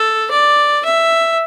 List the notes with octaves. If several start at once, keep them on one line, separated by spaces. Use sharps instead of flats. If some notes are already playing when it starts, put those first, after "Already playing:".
Already playing: A4
D5
E5